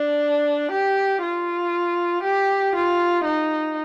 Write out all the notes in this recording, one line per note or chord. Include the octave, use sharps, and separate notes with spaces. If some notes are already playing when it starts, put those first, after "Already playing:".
Already playing: D4
G4
F4
G4
F4
D#4